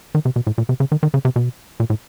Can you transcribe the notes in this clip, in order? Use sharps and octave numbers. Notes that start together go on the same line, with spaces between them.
D#3
C3
B2
A2
A#2
C3
C#3
D#3
D#3
C#3
C3
B2
A#2
A2